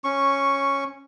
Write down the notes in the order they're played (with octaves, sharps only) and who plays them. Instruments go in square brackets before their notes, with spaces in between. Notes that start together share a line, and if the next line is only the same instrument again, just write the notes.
[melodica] C#4 C#6